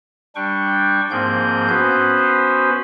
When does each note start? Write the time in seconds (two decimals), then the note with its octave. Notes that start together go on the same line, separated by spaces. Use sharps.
0.35 G3 D4 G5 C#6
1.11 G#2 F3 A#3 C4 G#4 G6
1.69 B3 C#4 F#4 B4 C5